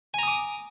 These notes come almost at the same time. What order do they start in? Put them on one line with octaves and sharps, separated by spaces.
G#5 A#5 D#6 D6